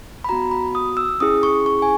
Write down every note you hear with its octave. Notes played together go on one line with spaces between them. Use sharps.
B5
B3 F#4 A#5
B5
D#6
E6
C#4 E4 G#4 D#6
C#6
C#6
G#5